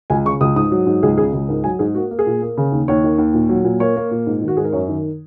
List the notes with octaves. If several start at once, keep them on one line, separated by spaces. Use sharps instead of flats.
C#2 G#5
C#3 C#6
C#2 D#6
G#2 D#6
F#3
G#2
C#2 G#4
C#3 G#4
C#2 G#4
G#2 A#4
F#3 G#5
G#2 G#4
A#3 F#4
A#3
G#4
A#2
A#3
C#3
D#2
D#2 C#5
D#3
D#2
A#2
F#3
A#2
A#3 C#5
A#3
A#2
G#2
D#3
F#4
G#2 G#4
A#4
F#2 C#5
D#3